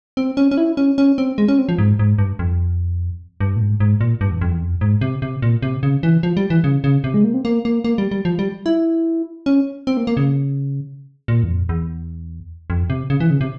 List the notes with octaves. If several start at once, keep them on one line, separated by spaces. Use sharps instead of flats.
C4
C#4
C#4
E4
C#4
C#4
C4
G#3
C#4
C4
F3
G#2
G#2
G2
F2
G2
A#2
G#2
G#2
A#2
G2
E2
F2
E2
F2
G#2
C3
C3
A#2
C3
C#3
E3
F3
G3
E3
C#3
C#3
C3
G#3
A#3
C4
A#3
A#3
A#3
G3
G3
F3
G3
E4
C#4
C4
A#3
A#3
C#3
A#2
E2
F2
E2
F2
C3
C#3
E3
C#3
C3